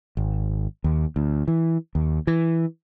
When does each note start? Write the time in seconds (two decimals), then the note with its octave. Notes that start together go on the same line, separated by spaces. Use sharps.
0.17 G#1
0.84 D#2
1.16 D2
1.48 E3
1.95 D#2
2.27 E3